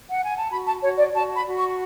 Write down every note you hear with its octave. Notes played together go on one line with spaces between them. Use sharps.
F#5
G#5
A5
F#4 B5
A5
F#4 C#5
D5
F#4 A5
B5
F#4
C#6